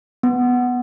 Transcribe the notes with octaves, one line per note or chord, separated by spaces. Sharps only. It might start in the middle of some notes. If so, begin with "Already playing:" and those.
B3